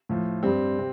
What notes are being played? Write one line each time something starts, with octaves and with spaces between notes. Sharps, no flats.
A2 F3
G2 G3 C4
C3